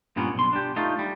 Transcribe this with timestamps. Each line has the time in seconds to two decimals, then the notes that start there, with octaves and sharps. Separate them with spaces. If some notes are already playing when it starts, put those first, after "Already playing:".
0.16 G2 A#2 B3 C#4
0.35 B1 C6
0.53 D4 G4
0.76 A3 D#4 F4
0.99 G3